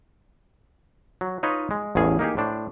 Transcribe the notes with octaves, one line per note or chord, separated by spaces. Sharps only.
F#3
D#4 F4 B4 C#5 D#5
G#3
A1 E2 A2 G#4 F5
A#3 D#4 G4 G#4
A2 D4 C5